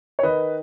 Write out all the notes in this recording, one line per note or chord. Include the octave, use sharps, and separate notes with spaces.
C#5
D#3 B4 D#5